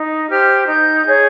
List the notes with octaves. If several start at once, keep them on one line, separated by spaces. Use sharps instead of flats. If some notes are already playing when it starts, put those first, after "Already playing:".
Already playing: D#4
G4 C5 F6
D#4 G6
G#4 C#5